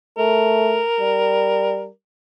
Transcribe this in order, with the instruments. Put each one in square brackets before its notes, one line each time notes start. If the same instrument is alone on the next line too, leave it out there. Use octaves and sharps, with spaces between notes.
[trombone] A3 [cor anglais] A#4
[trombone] G3